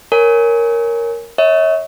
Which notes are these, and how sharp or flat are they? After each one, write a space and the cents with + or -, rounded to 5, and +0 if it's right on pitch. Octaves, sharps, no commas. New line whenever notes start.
A#4 +0 C#5 +0 G#5 +0
C#5 +0 E5 -45